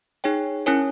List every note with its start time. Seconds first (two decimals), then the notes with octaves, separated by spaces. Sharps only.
0.24 D#4 G#4 C#5 G5
0.66 C#4 E4 A#4 C#5 G#5